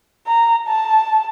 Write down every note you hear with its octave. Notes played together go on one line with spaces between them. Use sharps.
A#5
A5